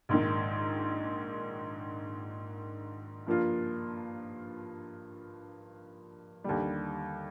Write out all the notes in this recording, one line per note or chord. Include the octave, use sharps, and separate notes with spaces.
A#1 G#2 D#3
G2 F3 A#3 F4
D#2 D3 G3